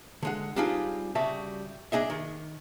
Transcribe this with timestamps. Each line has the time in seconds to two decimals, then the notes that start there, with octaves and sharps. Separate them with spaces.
0.23 D3 G#3 F#5
0.56 G3 C4 D4 D#4 F4 G#4
1.15 C#3 G3 F#4 E5 A5
1.92 D4 G#4 D#5 E5
2.10 D#3